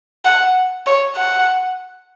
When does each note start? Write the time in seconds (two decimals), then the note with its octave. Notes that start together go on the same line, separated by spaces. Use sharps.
0.25 F#5
0.86 C#5
1.16 F#5